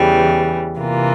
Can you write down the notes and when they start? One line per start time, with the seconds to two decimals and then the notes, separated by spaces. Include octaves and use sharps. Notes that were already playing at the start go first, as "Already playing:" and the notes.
Already playing: E2 C#3 E3 G3
0.78 C3 E3 A#3 F4